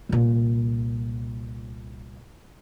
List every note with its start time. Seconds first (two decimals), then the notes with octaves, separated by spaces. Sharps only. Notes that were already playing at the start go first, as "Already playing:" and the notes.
0.09 C2 A#2